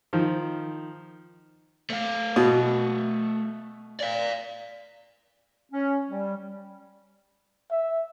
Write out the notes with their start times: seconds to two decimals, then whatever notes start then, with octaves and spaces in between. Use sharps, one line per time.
0.13 D#3 F3
1.90 A3 F5
2.36 B2
4.00 D5 F5
5.72 C#4
6.10 G3
7.71 E5